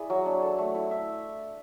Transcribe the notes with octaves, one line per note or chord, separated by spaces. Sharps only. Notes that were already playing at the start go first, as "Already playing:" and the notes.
Already playing: E4 G#4 D5
F#3
D4
A4
A3
E4
E5